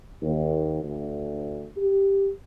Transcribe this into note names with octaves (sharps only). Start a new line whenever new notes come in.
D#2
D2
G4